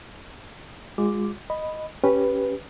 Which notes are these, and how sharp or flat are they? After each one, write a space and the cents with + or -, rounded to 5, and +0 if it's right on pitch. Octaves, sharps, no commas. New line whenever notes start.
G#3 -15 F4 +30 D6 +0
D#5 +0 B5 +0
C#4 +0 G4 +0 B4 +0